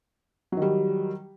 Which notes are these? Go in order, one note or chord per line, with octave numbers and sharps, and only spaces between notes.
D#3 F#3 G3